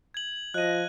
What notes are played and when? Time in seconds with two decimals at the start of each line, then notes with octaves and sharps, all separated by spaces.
0.14 G#6 F#7
0.54 F3 D#5 F#6 D#7